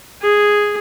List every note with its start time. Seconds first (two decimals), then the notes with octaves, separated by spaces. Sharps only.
0.22 G#4